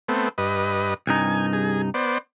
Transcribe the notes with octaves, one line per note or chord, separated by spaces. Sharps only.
A3 B3 C4
G2 B4 D#5
C2 G2 D#4 G#5
G#4
B3 C5 D5